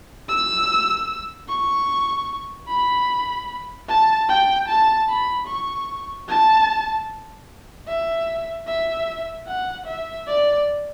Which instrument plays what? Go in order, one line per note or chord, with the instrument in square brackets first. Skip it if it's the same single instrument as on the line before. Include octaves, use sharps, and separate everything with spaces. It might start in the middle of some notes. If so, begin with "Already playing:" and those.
[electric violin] E6
C#6
B5
A5
G5
A5
B5
C#6
A5
E5
E5
F#5
E5
D5